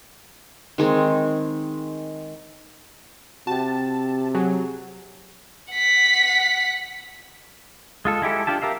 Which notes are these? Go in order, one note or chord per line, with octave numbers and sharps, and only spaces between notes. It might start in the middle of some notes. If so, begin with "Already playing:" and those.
D#3 G#3 C4
C3 F#4 G5 A5
F#3 G#4
F#5 B6
G#3 F4 A4
G#3 E4 G4 A4
D4 F4 G4 A5
G4 A#4 E5 F5